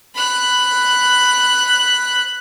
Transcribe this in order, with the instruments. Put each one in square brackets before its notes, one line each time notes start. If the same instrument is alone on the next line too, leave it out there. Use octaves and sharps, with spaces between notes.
[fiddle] B5 F#6